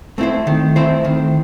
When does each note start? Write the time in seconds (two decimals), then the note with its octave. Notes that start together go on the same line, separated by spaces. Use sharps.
0.18 A3 C4 E4 C5
0.47 D#3
0.76 A3 C4 E4 C5
1.05 D#3